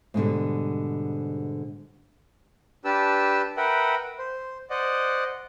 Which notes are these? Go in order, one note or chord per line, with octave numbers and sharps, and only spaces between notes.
G#2 B2 D3 G3
D4 G4 B4 A5 E6
A#4 B4 E5 F#5 G5
C5
C5 D5 D#5 F#5